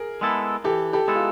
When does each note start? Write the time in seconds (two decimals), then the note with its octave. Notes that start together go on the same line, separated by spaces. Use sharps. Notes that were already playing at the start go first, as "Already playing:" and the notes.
Already playing: G#4 A#4
0.21 G#3 B3 E4 A4
0.64 E3 G4 A4
0.93 G4 A4
1.08 G#3 B3 E4 A4
1.15 F4